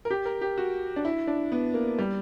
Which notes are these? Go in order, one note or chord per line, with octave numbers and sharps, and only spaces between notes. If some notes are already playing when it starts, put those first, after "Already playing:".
A#4
G4
A#4
G4
F#4
D4
E4
D4
B3
A#3
G3